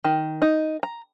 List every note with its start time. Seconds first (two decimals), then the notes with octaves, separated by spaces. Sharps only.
0.04 D#3
0.42 D#4
0.83 A#5